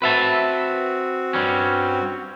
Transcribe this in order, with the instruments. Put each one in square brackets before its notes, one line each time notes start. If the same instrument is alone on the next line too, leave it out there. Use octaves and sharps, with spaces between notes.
[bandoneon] C4 F#4 [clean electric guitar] B4 E5 A5
[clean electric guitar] G2 G3 C#4